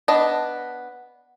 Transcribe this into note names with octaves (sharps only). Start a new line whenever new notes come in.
B3 D4 D#5